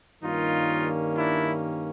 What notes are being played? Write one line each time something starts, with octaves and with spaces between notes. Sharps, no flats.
G2 D#3 G3 A#3 C#4 D#4 F4
D4 E4